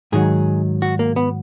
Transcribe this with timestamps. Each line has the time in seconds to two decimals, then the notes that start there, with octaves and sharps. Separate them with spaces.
0.12 G#2 D#3 F#3 G#4
0.82 F#4
0.99 A#3
1.16 B3